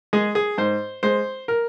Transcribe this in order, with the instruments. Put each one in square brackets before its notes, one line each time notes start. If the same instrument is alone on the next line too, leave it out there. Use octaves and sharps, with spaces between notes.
[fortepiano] G#3 G#4
G#4
G#2 C5
G#3 C5
A#4